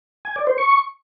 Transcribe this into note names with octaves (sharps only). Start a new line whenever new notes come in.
G#5
D5
C5
C#6